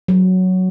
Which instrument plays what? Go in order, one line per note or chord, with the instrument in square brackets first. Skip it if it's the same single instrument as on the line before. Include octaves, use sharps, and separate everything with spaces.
[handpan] F#3